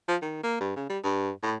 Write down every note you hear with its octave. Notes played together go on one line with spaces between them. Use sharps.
F3
D#3
A#3
G2
C#3
G3
G2
A2